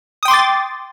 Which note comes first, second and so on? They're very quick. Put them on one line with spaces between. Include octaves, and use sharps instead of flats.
D#6 G5 C6 D6 A6